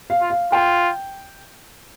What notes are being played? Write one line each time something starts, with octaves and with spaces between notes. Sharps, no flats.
F5
F4
F5
F4 G5